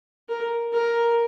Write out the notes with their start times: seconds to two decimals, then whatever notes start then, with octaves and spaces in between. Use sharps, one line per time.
0.29 A#4
0.73 A#4